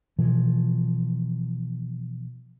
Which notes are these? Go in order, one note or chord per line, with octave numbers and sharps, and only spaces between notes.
B2 E3 F3